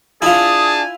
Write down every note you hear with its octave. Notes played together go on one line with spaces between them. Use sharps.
D4 E4 F4 G#4 G#5 A5 D#6